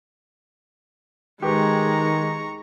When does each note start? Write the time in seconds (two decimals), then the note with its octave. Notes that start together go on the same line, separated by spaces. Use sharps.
1.42 D#3 G#3 G4 B4 A#5 C#6